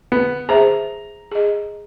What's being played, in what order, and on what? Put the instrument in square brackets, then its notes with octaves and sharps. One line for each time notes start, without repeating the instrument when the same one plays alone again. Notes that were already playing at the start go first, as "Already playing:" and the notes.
[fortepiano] B3
[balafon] G#4 C5 E5 [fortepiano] A#5
[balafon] G#4 D#5